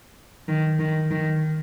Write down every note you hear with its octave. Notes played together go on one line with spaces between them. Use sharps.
D#3
D#3
D#3